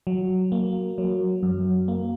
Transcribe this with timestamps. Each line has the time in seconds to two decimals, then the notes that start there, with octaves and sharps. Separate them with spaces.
0.07 F#3
0.52 A#3
0.98 F#3
1.43 F#2
1.88 A#3